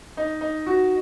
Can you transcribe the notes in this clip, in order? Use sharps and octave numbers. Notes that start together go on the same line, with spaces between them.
D#4
D#4
F#4